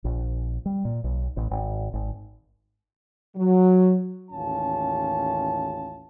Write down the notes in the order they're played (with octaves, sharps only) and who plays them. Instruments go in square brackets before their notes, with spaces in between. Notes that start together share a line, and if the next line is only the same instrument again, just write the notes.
[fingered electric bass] A#1
G3
A#2
B1
A1
G#1
G#1
[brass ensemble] F#3
A1 D#2 C#4 F4 A5